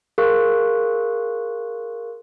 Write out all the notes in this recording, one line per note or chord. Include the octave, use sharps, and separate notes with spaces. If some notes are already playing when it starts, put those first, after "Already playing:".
G#4 A#4 F5 C6 C#6 F#6